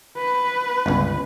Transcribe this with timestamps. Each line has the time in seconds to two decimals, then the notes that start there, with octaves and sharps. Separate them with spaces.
0.17 B4
0.86 G1 C#2